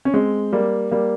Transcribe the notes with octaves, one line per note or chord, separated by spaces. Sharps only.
C#4
G#3 C4
G3 A#3
G3 A#3